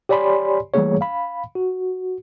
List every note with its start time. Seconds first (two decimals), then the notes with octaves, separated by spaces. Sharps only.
0.09 G4 C#5 D5 G#5 B5 C6
0.74 E3 G3 A3 A#3 G#4 C#5
1.01 F5 B5
1.55 F#4